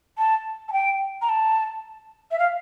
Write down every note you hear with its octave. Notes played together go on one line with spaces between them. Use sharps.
A5
A5
G5
A#5
A5
E5
F5